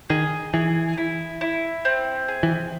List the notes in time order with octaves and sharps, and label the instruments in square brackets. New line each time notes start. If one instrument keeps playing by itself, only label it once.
[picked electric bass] D#3 [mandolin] G#4
[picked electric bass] E3 [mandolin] G#4
[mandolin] E4
E4
C4
G#4
[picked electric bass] E3